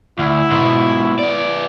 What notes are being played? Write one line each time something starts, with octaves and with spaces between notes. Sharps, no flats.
D2 E4
G#2 B2
B3 D5